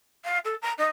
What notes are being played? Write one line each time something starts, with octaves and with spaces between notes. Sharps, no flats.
F5
A4
A#5
D#4